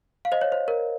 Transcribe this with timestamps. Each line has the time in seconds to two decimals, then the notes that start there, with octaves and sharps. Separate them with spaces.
0.25 F5
0.32 C5 D#5
0.41 C#5
0.52 C5
0.68 A#4